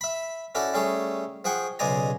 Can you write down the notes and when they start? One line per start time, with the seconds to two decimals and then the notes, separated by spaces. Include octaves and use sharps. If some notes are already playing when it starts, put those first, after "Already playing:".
0.01 E5 B5
0.55 C#4 E4 F#4 A4 D5
0.74 G3 A3 C#4 G#4 A4
1.45 F3 G#4 F#5 G5 C#6
1.79 B1 C#3 G#3 D5 G#5 A#5